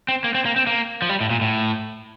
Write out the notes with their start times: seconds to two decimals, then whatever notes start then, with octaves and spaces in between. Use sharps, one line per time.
0.08 C4
0.24 A#3
0.35 C4
0.46 A#3
0.56 C4
0.67 A#3
1.02 F3
1.09 G3
1.21 A2
1.31 A#2
1.41 A2